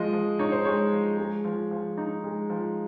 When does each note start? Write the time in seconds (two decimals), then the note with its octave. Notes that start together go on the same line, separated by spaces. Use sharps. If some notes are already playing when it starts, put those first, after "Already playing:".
Already playing: F3 G#3 D#5
0.13 F3
0.39 D#4 C#5
0.52 C5
0.65 G#3 C#5
0.92 F3
1.18 G#3
1.45 F3
1.71 F3
1.98 D#4
2.24 G#3
2.50 F3